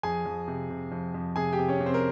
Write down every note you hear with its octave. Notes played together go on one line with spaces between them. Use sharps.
F2 G#4 G#5
F2
C3
C3
F2
F2
C3 G#4 G#5
G4 G5
C3
C#4 C#5
C3
C4 C5
A#4